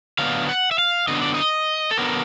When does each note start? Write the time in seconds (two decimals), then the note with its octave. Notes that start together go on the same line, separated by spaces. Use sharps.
0.19 D3 F#3 B3 D4 F5
0.49 F#5
0.71 E5
0.78 F5
1.08 D3 F#3 B3 D4 D#5
1.22 D5
1.34 D#5
1.91 A4
1.98 D3 F#3 B3 D4 A#4